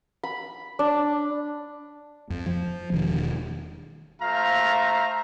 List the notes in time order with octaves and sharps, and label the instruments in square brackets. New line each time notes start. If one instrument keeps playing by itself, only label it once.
[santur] B5
D4
[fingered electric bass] F2
F3
E1 D#3 D4
[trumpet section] A3 F4 C5 E5 F5 A#5